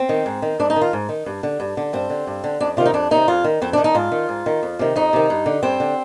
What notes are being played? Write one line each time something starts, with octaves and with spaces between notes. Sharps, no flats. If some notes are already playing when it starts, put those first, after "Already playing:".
Already playing: C4
D#3
G#2
D#3
G#2 D4
D#4
D#3
F4
G#2
D#3
G2
D3
G2
D3
G2 C4
D3
G2
D3
F2 D4
C3 D#3 F4
D#4
F2 D4
C3 D#3 D#4
F2 F4
D#3
F2 C4
D#3 D4
D#4
G#2 F4
D#3
G#2
D#3
F2
C3 D#3
F2 D#4
C3 D#3
G2
D3
G2 C4
D3